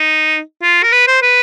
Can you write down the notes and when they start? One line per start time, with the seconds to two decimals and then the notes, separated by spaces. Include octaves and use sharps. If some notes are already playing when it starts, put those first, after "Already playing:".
Already playing: D#4
0.62 F4
0.83 A#4
0.92 B4
1.07 C5
1.22 B4